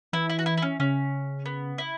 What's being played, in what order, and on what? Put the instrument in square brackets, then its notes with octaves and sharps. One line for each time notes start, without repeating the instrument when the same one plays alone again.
[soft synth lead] E3 [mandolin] E4
[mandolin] E4
F#4
E4
E4
C#4
[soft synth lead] C#3 [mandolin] C#4
[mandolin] B3
E4